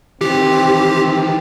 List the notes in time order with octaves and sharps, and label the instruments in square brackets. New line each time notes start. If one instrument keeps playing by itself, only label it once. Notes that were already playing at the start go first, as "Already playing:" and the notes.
[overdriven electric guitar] D#3 E3 [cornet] C4 [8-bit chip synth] G4